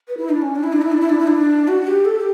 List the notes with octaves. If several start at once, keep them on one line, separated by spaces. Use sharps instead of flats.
B4
E4
D4
C#4
D4
E4
D4
E4
D4
E4
D4
E4
D4
F#4
G4
A4
G4